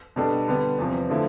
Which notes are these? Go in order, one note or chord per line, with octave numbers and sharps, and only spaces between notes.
B2 G3 D4 A4
D3 G3 B3
E2 C3 F3
D3 F3 A3 E4